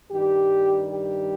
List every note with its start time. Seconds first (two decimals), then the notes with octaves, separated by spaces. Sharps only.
0.11 G2 D#3 G3 G4
0.93 G4